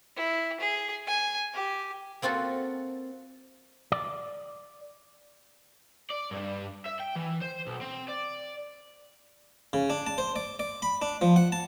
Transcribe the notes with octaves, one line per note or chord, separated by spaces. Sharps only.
E4
G#4
G#5
G4
A#3 C4 F4 F#4 A4
D5
D5
G2
E5
G5
E3
C5
B1
C4
D5
C#3
D4
A5
C5
D5
D5
B5
D4
F3
F#5
A5